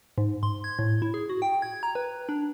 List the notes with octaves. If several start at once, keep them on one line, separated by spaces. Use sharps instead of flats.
G#2
C6
G#6
A2
E4
G#4
F#4
G5
G#6
A#5
B4
D4